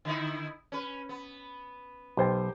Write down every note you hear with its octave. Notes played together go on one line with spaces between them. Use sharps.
D3 D#4 E4
C#4 B4
B3
B1 G4 C5 G5